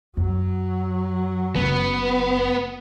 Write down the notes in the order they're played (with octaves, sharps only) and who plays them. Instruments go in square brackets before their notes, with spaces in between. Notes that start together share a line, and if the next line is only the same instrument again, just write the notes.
[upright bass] F#2 [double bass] F#3
[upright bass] F#1 [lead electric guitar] B3